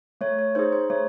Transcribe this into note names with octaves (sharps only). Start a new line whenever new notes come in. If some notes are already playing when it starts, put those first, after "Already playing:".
A3 C#5
C#5
D#4 G#4 C5
C5
A3 C#5